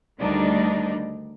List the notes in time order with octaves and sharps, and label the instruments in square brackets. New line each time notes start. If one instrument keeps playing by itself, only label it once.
[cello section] D2 D#3 G3 D4 D#4